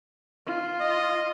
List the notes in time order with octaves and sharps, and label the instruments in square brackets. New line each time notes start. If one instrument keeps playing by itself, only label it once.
[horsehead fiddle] F4
[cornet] D#5